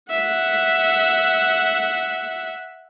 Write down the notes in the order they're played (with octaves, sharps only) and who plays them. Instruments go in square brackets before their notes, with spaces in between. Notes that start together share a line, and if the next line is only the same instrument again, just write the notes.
[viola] E5 F#5